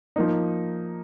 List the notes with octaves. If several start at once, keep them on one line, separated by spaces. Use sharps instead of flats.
F3 A#3 D#4